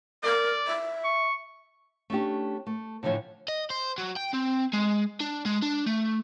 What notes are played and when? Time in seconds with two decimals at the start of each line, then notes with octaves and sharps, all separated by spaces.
0.24 A#4 D5
0.67 E5
1.04 C#6
2.10 A3 C#4 D4 G4
2.67 A3
3.03 A2 D3 E3 F3 C#5
3.48 D#5
3.70 C5
3.98 F#3
4.17 G5
4.34 C4
4.74 G#3
5.21 D4
5.46 G#3
5.62 D4
5.86 A3